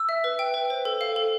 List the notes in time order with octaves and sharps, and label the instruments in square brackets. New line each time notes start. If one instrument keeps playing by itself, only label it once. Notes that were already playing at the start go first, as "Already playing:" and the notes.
Already playing: [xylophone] E6
E5
B4
G5
B4
C5
A4
F5
A4